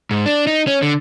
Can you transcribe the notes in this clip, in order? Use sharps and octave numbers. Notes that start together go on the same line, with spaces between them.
G#2
D4
D#4
C#4
D3